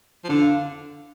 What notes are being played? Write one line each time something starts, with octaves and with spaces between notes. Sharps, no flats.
F3
D3 D4
F5